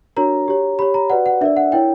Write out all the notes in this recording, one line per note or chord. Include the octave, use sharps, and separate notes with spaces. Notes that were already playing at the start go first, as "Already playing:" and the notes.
D4 F#4 A#4 C#5 A#5
G4 C#5
G4 C#5 B5
A#5
F#4 B4 D5 F#5
F#5
D4 A#4 D5 E5
F#5
E4 A#4 C#5 G5